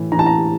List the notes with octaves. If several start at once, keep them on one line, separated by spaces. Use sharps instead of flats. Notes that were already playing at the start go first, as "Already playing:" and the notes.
Already playing: A2 E3
E3 A#5
A5
A#5